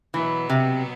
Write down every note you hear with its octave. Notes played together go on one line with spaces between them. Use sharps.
B2 E3 F#3 B3
C3